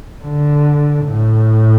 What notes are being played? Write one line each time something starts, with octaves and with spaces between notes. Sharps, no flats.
D3
A2